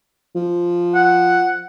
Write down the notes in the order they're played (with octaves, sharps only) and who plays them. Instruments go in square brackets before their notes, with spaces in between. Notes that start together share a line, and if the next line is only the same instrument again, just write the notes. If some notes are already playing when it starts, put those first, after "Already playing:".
[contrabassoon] F3
[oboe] F#5